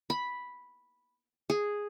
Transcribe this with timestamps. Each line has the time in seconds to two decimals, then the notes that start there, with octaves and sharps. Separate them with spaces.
0.10 B5
1.50 G#4